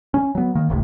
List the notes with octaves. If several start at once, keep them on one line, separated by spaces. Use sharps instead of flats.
C#4
F#3 B3
D#3 A#3
D1 G1 C2 A2